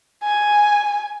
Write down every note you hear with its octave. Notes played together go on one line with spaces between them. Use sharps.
G#5